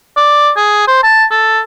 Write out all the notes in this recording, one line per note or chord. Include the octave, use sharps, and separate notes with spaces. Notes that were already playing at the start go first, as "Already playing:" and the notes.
D5
G#4
C5
A5
A4